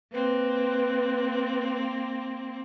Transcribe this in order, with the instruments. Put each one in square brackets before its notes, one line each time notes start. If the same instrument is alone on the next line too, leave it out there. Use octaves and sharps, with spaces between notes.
[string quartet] A#3 C4 [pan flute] B4